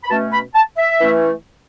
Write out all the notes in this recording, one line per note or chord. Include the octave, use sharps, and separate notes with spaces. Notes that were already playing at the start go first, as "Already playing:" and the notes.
B5
B2 A3 C#4 A5
B5
A5
E5
E3 A3 C#4